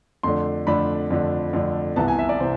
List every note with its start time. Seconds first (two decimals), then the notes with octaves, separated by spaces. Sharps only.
0.23 F2 D3 A3 D4 C6
0.67 F2 D3 A3 D4 B5
1.10 F2 D3 A3 D4
1.53 F2 D3 A3 D4
1.96 C2 C3 E3 B3 A5
2.08 G#5
2.19 E5
2.29 D5
2.40 C3 E3 C5